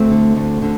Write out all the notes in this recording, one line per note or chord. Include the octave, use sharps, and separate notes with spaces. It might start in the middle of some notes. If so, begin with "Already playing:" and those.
Already playing: D2 A3 C4
D3
D2
D3